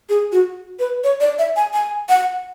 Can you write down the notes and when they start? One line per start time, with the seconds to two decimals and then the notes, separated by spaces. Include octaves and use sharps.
0.09 G#4
0.32 F#4
0.79 B4
1.04 C#5
1.20 D5
1.39 E5
1.56 G#5
1.74 G#5
2.09 F#5